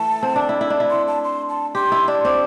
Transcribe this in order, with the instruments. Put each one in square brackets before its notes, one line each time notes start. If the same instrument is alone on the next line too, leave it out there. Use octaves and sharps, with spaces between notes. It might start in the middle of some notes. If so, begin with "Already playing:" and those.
Already playing: [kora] E3 A3 [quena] A5
[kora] C4
D4
E4
E4
D4
E4
[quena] C6
A5
C6
A5
[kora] G4 [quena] C6
[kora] E4
D4
[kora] C4 [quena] D6